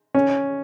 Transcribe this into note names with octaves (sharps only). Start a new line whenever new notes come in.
C#4